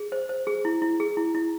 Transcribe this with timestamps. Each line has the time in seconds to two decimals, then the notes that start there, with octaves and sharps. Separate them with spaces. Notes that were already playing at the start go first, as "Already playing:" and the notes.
Already playing: G#4
0.12 C5
0.29 C5
0.47 G#4
0.65 E4
0.82 E4
1.00 G#4
1.17 E4
1.35 E4